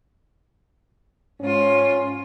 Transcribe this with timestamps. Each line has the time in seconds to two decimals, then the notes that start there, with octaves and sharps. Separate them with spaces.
1.40 G#2 C#4 F4